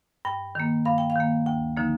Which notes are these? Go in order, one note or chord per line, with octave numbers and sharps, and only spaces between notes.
G2 G5
D#3 A#3
G2 F5
G5
F5
D#3 A#3
D2 G5
D3 F3 A#3 D#4